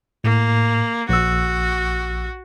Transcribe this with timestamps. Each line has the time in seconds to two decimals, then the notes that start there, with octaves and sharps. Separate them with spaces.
0.24 A2 A#3
1.09 A#1 F#4 E6